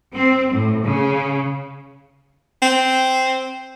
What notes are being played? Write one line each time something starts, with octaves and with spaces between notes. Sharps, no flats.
C4
A2
C#3
C4